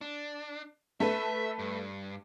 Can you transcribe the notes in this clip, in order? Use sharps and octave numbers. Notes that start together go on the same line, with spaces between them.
D4
A3 A4 B4 E5
G2